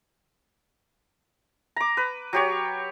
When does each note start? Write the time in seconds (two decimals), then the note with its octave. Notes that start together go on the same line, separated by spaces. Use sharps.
1.76 A#5 D6
1.97 B4
2.33 F#3 G4 C#5